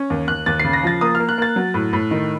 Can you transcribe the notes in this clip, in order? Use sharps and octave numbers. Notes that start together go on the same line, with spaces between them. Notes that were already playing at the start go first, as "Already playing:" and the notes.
Already playing: C#4
D#2
D#2 F#6
D#2 A6
C7
C#3
A#6
F3 A6
A#3 D#6
F6
A#3
F#6
A#3 A6
F#3
A2
A2
D#3